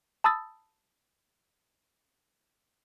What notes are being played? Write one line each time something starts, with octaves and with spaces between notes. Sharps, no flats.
A5 B5 D#6 E6 A6